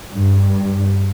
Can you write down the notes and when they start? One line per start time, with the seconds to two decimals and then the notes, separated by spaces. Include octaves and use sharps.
0.14 G2